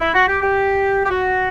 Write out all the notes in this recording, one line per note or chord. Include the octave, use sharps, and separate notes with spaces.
E4
F#4
G4
G4
G4
F#4